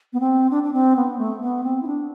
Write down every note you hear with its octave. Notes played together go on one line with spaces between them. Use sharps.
B3
C4
D4
D4
C4
B3
A3
B3
C4
E4
D4